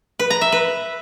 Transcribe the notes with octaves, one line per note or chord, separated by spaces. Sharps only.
B4
A#5
E5
B4